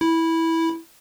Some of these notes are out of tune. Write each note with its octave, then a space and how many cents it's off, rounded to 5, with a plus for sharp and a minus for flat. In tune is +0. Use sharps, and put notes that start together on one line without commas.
E4 -10